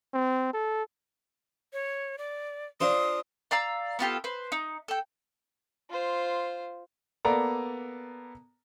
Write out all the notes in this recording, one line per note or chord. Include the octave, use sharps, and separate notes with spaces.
C4
A4
C#5
D5
D4 F4 C5 D#6
D5 F5 A#5 E6
B3 F4 G4 A4
B4 C5
D#4
A4 G5
F4 C5
A#3 B3 A4 D5 A#5